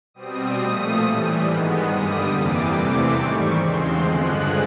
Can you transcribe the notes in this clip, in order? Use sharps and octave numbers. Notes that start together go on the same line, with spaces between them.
B2 G3 C4 D#6
A#2 F3 A3
A2 E3 G3
G#2 D#3 G#3 B3
G2 D3 G3 D#6
F2 C3 E3 G3 A#3 D6
E2 C3 E3 A3 C4 D6
G#2 D#3 G3 C#6
E2 C#3 F3 G#3 C4 C6
G2 D3 F3 G#3 F#6